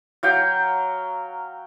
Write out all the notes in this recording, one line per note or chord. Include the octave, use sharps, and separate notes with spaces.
F#3 F5 G5